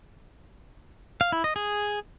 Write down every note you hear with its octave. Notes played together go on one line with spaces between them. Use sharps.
F5
E4
D#5
G#4